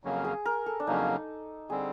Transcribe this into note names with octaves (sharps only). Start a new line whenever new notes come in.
F2 C#3 F#3 A#3 C#4
G#4
A#4
A4
D4
F2 C#3 F#3 A#3 C#4 D#4
D3 G3 C4 G#4